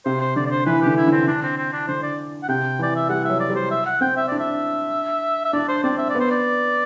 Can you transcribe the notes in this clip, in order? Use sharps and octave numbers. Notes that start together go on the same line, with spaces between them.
C3 C5
C5
D3 D5
D5
C5
E3 B4
D3 G4
E4
D3 C4
D3 D4
C4
C4
D4
D3 C5
D5
F#5
C3 G5
E3 D5
E5
G3 F#5
F#3 E5
D5
G3
C5
E5
F#5
C4 G5
E5
D4 D5
E5
E5
D4 D5
C5
C4 D5
E5
D5
B3
C5
D5